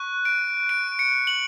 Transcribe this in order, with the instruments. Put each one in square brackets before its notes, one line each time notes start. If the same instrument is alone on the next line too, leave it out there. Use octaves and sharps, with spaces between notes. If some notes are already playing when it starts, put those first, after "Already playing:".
Already playing: [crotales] C#6 F#6
D7
D7
C#7
F#7